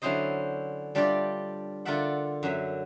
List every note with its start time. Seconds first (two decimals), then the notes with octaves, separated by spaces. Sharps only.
0.02 D3 F#3 C#4 E4 C5 D#5
0.95 G3 D4 F4 G4 D5 E5
1.85 D3 F4 A#4 D5 E5 F#5
2.43 F#2 F#3 E5